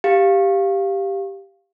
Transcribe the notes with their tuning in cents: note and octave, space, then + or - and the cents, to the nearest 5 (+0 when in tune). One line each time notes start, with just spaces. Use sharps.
G4 +0 F5 +0